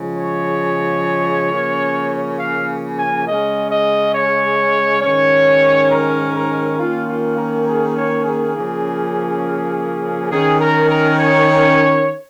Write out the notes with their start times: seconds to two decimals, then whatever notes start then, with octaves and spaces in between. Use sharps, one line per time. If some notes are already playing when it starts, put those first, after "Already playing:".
Already playing: C#3 F3 G#3
0.19 C#5
1.51 C#3 F3 A#3 C#4
2.39 F5
2.97 G#5
3.26 C#3 G#3 C#4 D#5
3.71 D#5
4.14 C#5
5.02 G#2 D#3 C#4 C#5
5.90 A#4
6.35 A#4
6.78 D#3 A#3 C#4 F4
7.08 F4
7.37 A#4
7.67 G#4
7.96 C#5
8.25 G#4
8.55 C#3 F3 A#3 C#4
10.31 D#3 C#4 G#4
10.60 A#4
10.89 A#4
11.18 C#5